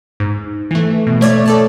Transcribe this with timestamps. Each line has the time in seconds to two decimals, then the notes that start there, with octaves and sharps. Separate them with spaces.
0.20 G#2
0.71 E3 A3
1.07 B2
1.21 A3 C#5 D5
1.46 A4 D5 A5